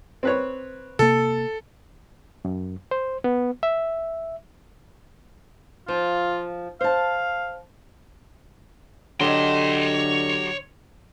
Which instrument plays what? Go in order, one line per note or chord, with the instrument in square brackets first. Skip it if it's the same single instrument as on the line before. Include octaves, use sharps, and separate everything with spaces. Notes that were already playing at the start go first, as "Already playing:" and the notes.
[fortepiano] C4 B4 C#5
[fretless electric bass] C3 A#3 [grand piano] A4
[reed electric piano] F#2
C5
B3
E5
[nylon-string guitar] F3 [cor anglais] F4
[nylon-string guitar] C5 A5 [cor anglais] F5
[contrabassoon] D3 [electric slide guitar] F#3 G4 [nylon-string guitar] A4 D#5 [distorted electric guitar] C#5 C6